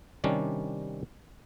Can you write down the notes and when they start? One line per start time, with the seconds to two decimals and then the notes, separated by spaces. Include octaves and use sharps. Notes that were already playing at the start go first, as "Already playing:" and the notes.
0.24 C3 D#3 G3 C#4 D4